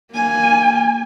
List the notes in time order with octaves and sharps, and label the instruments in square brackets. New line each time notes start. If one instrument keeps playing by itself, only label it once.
[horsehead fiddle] A#3 G#5